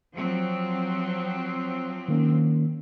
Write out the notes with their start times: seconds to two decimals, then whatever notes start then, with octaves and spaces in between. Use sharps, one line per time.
0.15 F3 F#3 C4
2.08 D#3 A#3 C#4